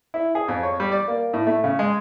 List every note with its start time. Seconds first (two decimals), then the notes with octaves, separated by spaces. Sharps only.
0.14 E4
0.35 G#4
0.48 F2
0.63 C#5
0.80 G3
0.92 D5
1.08 A#3
1.33 A2
1.47 A3
1.64 C#3
1.79 G#3